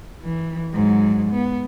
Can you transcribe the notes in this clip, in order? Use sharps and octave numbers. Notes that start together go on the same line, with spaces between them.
E3
G#2 F#3
B3